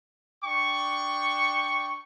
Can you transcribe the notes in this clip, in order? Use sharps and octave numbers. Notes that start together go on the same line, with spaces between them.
D4 G5 C#6